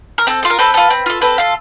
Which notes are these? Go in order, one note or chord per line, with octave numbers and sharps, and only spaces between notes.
A#4
C4 A4
F4 A4
A#4
C4 A4 B4
F4 A4
C4
F4 A4
C4 A4 B4
F4 A4